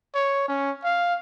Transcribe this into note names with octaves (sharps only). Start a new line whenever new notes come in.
C#5
C#4
F5